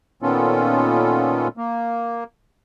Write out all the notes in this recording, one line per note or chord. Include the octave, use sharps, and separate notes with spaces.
A#2 D#3 B3 C#4 F4 A4
A#3